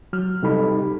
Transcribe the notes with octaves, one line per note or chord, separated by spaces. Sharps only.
F#3 F6
C3 G3 D#4 G4 A4 B5